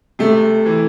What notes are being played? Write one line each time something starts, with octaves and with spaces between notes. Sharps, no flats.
C3 A3
E3